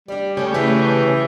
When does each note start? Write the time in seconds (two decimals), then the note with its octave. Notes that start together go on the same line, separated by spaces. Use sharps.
0.08 G3 D4 D5
0.37 G#2 C#3 A3 C#4 G4
0.54 E3 A3 G#4 B4